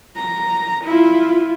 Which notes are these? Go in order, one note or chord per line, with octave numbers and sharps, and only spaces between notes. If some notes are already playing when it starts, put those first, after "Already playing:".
A#5
E4 F4